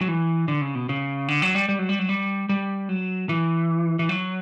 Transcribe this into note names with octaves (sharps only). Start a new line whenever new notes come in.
F#3
E3
D3
C#3
B2
C#3
D3
F#3
G3
G3
F#3
G3
F#3
G3
G3
F#3
E3
E3
F#3